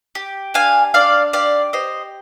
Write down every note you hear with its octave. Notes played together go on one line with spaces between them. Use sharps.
G4
D4 F5 G#5
D4 D5 F5
G4 D5 F5
G4 C5 D#5